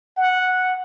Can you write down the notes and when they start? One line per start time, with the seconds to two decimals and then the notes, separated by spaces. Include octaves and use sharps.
0.17 F#5